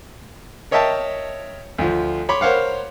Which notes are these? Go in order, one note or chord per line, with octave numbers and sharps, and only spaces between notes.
A#4 C#5 D#5 E5 G5 A5
D2 F3
C#5 B5 C6 D6
A#4 C5 C#5 F5 F#5